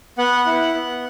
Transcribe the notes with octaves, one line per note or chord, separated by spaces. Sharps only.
B3 F#5
E4
B3